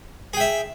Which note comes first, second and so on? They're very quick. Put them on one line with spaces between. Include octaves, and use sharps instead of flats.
G#4 G5 E5